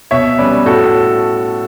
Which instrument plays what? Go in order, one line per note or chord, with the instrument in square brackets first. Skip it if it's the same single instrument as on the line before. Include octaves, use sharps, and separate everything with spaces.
[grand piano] B2 C#5 E5
G3 C#4 B4 D5
A2 F#4 A4
A4